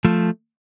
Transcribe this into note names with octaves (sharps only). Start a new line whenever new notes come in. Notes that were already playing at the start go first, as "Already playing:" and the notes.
F3 A3